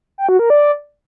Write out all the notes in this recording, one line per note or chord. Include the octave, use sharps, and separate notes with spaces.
G5
F#4
A#4
D5